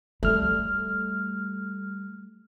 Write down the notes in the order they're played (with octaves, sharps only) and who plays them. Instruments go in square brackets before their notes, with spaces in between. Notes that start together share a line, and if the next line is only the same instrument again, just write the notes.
[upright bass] G3 [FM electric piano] A3 F6